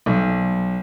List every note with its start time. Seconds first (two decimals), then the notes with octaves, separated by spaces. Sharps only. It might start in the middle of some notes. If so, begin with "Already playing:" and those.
0.06 B1